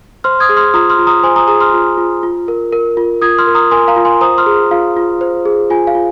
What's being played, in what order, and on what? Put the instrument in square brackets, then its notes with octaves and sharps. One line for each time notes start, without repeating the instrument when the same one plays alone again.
[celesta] C5 C6 F6
D#6 G#6
G#4
C6 F6
F4 A#5 D#6
C6 F6
F4
A#5 D#6
C5 G#5 C6
A#5 D#6
G#4 A#5 D#6
C6 F6
F4
F4
F4
A#4
A#4
F4
F4 D#6 G#6
C6 F6
A#4
A#5 D#6
A#4 G#5 C6
F5 A#5
F4
G#5 C6
C5 A#5 D#6
C6 F6
G#4
F4 F5
F4
C5
G#4
F4 G#5
F5
F4